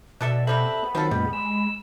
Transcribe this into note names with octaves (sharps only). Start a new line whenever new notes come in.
B2 D4 A4 D5 E5
C3 G3 C4 A4 E5 B5 F#6
B3
D#3 F#3 C4 F4 A4
F#2 A#2 G3 G#3
G#3 E6